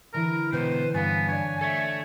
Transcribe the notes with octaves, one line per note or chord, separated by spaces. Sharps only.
D3 E3 E4 A#4
B2 E3 B4 C5 G5
G2 B3 C#5 F5 G#5
D4 C#5 D5
A4 C#5 E5